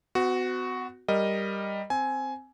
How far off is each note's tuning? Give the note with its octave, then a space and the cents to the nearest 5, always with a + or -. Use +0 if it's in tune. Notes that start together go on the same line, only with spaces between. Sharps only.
B3 +45 F#4 +0
G3 +5 A#4 +0 D#5 +0
C4 +0 G#5 +15